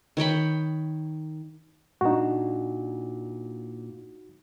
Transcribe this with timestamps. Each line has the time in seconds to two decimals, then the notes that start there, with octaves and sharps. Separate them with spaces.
0.17 D#3 C#5 G5 B5
2.01 A#2 D4 D#4 F#4